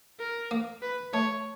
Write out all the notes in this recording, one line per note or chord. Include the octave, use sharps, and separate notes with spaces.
A#4
A#3
B4
A3 C#5